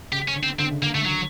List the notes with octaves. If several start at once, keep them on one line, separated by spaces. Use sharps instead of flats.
C#3 G4
C#4
D3
C4
D3 C4
C#3
D3 A#3
D3 A3
D#3 F#3